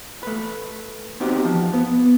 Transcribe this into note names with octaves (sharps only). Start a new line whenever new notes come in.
A3 B4
B3 C4 D#4 F#4 G4
F3
B3